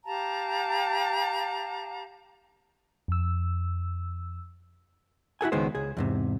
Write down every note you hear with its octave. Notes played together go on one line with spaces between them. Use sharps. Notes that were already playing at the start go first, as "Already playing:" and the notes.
G4 F5 A5 A#5
F2 E6
E4 F#4 A4 G#5
C#2 D#3 G#3 B3 C5
C#2 G#4
E2 G#2 C3